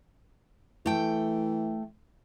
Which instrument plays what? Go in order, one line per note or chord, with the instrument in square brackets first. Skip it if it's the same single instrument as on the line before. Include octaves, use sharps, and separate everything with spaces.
[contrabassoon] E3 [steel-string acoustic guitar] A3 G5